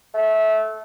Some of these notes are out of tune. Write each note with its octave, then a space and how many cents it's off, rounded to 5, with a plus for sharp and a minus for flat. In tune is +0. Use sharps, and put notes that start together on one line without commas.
A3 -20